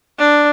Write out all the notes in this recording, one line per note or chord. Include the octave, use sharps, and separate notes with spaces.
D4